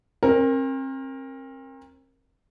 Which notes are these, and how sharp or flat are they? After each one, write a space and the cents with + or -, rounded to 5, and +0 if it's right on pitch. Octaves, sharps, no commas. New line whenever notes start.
C4 +40 A#4 +0